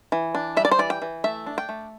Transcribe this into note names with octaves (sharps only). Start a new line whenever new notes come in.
E3
D4
G3 E5
D5
C5
E3 D5
G5
E3
A3 E5
D4
G5
A3